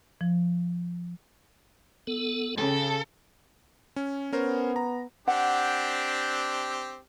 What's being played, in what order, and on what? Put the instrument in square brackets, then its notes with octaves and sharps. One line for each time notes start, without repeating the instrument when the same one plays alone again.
[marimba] F3
[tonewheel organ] B3 A4
[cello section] C#3 [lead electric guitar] A4 [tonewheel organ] G5
[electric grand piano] C#4
[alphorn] B3 [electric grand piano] C#4 A#4 C5
[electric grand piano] A#5
[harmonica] C4 D4 G4 [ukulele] F#5